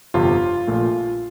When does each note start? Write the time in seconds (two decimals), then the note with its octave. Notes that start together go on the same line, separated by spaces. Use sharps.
0.14 G1 F2 C3 F4
0.67 A#1 A#2 A3